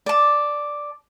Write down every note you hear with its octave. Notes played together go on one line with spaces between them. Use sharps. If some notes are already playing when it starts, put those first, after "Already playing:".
D5 A5